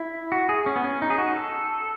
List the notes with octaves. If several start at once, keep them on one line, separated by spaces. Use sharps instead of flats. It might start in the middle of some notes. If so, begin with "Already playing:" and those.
Already playing: E4
F#4
G#4
C#4
B3
C#4
D#4
G#4
F#4
A4